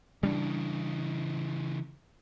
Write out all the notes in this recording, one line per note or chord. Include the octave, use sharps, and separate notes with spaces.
C#3 E3 G3 C#4 D4